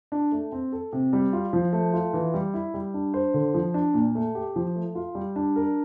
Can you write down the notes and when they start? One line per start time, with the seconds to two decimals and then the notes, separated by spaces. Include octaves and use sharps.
0.12 D4
0.32 A3
0.52 C4
0.72 A4
0.93 C3
1.13 G3
1.33 F4
1.53 F3
1.73 A3
1.93 F4
2.14 E3
2.34 G3
2.54 E4
2.74 G3
2.94 D4
3.14 C5
3.34 D3
3.54 F3
3.74 D4
3.94 A#2
4.15 A3
4.35 G4
4.56 F3
4.76 A3
4.95 F4
5.15 G3
5.36 D4
5.56 A#4